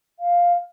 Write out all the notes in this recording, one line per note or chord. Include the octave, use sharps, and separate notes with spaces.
F5